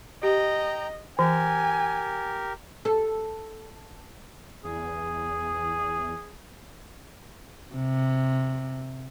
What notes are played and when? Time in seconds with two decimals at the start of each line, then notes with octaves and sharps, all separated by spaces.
0.23 G4 D#5 G5 A#5
1.19 E3 G4 A#4 G#5
2.85 A4
4.64 E2 G#4
7.74 C3